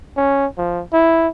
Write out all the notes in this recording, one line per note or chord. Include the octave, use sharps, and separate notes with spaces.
C#4
F3
E4